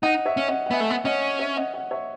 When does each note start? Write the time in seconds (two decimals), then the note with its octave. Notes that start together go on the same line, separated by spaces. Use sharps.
0.03 D#4 D#5 F#5
0.25 C#5 E5
0.37 C#4
0.48 D#5 F#5
0.66 F#5
0.71 B3 E5 G#5
0.80 A3
0.90 B3
1.05 C#4 D#5 F#5
1.39 C#5 E5
1.56 D#5 F#5
1.74 D#5 F#5
1.91 C#5 E5